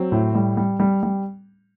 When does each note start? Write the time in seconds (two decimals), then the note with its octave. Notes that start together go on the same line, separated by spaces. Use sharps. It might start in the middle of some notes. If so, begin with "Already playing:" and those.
Already playing: F#3 C4
0.12 A2
0.35 G3
0.57 G3
0.80 G3
1.03 G3